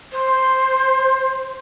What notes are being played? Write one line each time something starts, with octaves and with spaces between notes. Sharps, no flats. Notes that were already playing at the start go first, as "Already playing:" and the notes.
C5